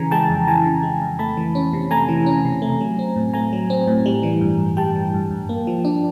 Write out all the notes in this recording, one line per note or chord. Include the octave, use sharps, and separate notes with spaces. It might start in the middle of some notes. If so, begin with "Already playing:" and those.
Already playing: C#3 E3 G#5 A#5
G#3 G5 A5
F2
E3 G#5 A#5
C#3
G#3
F2
A3 A5 B5
E3
C#4
C3
A3 G#5 A#5
E3
C#4
C3
A3
F#3
C4
A2
A3 G#5 A#5
F#3
C4
A2
G3
E3
G2
G2
G3 G5 A5
E3
G2
G2
A#3
F3
D4